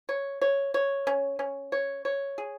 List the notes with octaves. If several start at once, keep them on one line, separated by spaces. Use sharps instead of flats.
C#5
C#5
C#5
C#4
C#4
C#5
C#5
G#4